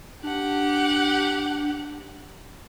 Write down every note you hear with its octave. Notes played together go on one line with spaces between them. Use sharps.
D4 G4 F#5